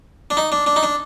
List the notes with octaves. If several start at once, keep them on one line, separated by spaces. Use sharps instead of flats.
D4
D#4
D4
D4
D#4
D4